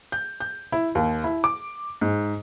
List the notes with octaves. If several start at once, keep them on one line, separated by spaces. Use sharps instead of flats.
G6
G6
E4
D#2
E4
D6
G#2